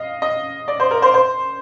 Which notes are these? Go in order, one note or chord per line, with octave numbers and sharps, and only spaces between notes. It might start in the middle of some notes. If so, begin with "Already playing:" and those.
Already playing: D#5 F5
D#5
D5
C5
A#4
C5
C5